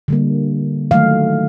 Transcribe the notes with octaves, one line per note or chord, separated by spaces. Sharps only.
D3 G3 A#3
D#3 F#3 A3 F5